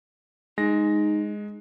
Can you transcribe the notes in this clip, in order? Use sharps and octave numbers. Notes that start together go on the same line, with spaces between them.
G#3 D#4 A#6